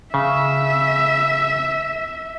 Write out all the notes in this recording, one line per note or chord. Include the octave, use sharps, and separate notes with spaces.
C#3 E5